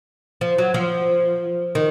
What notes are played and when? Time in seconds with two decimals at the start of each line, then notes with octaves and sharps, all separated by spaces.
0.41 F3
0.58 F#3
0.74 F3
1.75 D#3